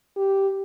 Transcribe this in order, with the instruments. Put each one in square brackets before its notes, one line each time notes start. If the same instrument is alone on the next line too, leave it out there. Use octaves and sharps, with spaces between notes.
[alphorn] G4